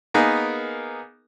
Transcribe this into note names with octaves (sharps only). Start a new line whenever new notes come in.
A#3 B3 D#4 G#4 A#4